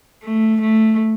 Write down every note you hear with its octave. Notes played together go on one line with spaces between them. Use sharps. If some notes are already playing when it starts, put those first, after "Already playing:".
A3
A3